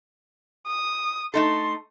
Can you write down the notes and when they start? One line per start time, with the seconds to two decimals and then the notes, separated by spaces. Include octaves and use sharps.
0.67 D#6
1.34 A3 D#4 A4 C6